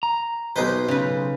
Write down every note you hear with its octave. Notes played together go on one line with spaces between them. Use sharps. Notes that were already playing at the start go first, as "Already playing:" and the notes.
A#5
B1 D#4 B4 C5
C#3 B4